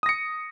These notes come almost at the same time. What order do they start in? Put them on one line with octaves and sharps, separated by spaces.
D#6 A#6 C#7